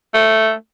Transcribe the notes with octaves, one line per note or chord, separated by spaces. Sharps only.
A3